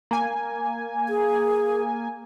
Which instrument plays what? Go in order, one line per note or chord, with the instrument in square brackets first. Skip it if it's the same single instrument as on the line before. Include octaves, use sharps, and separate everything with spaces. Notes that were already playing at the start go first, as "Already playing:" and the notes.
[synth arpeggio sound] A#3 G#5
[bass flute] G#4